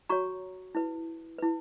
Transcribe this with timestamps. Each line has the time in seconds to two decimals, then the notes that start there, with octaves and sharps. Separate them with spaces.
0.09 F#4 C#5 A#5 C#6
0.75 E4 B4
1.38 E4 B4